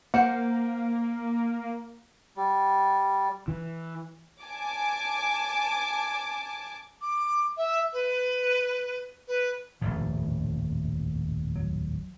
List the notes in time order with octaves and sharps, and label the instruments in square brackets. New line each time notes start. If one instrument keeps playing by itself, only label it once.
[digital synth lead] A#3 [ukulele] C5 F#5
[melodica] G3
[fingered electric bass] E3
[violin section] G#5 A5 D6
[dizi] D6
E5
B4
B4
[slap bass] D#1 A1 F2 [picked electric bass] F3
[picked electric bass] F#3